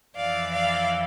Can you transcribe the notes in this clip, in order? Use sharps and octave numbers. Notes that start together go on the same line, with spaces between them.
F2 E3 D5 F5
D5 F5